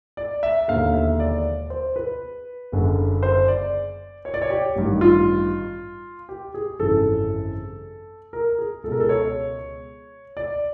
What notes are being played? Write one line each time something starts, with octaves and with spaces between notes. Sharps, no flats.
D5
E5
E1 D#2 D3 F5
E5
D5
C5
B4
F#1 F#2 D3
C5
D5
C#5
D5
C#5
G4
A1 G2 D#3
F4
G4
G#4
G#1 F#2 C#3 E3 A4
A#4
G#4
C#2 B2 A4 A#4
A4
C#5
D5